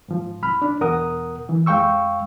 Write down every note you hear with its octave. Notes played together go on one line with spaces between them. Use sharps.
G#2 F3
C2 B5 F6
D4
E2 B2 A#4 F#5 D#6
E3
F2 G#3 F5 G5 C#6 E6